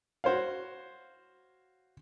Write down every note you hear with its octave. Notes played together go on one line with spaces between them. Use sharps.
F#4 C5 C#5 F5